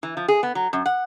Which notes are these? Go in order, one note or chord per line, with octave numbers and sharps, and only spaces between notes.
E3
F3
G#4
B3
F#3
F#2
F#5